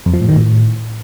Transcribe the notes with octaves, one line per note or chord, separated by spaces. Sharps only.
F2
F3
A2
D#3
A2